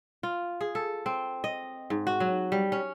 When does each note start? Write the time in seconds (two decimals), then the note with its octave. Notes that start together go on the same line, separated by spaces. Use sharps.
0.23 F4
0.61 G#4
0.75 A4
1.06 C4
1.44 D#5
1.90 G#2
2.07 F#4
2.20 F#3
2.52 G3
2.72 C#4